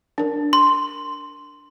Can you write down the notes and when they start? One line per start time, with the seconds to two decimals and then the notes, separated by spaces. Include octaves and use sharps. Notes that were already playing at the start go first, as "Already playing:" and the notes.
0.18 D4 A#4
0.53 C6